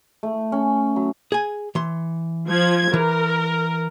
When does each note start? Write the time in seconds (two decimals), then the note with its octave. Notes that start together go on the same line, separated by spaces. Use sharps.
0.23 A3
0.52 C#4
0.96 F#3
1.32 G#4 G#5
1.75 E3 C6
2.47 F3 G#6
2.94 E3 A#4